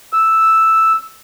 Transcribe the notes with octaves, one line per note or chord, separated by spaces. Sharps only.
E6